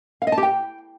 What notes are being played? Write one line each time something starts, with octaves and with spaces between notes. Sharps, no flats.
F5
D#5
A5
G4
G5